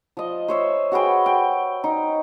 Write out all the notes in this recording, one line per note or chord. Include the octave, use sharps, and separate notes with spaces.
F3 D#5
C5 C#5 E5
F#4 G#4 B4 G5
G5
D#4